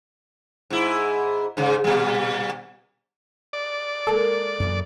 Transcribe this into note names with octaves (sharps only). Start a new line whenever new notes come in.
G#2 E4
G#2 C#3
A#2 G3
D5
G#3 A#3 A4 A#4
F#2 A#2 E3